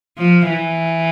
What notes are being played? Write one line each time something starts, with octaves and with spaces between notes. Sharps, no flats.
F3
E3